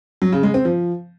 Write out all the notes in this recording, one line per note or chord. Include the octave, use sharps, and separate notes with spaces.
F#3
C#3
G#3
C4
F3